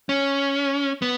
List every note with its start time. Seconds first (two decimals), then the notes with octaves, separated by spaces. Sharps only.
0.09 C#4
1.02 B3